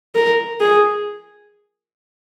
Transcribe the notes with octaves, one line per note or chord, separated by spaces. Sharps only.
A#4
G#4